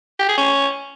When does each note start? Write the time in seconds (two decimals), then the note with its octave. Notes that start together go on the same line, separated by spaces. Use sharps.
0.19 G4
0.28 G#4
0.37 C#4